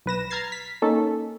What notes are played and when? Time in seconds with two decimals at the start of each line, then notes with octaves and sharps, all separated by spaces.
0.06 B1 B4 A#6 E7
0.30 A#5 F6 G#6 A6 C7
0.52 B6
0.82 A#3 C#4 D#4 A4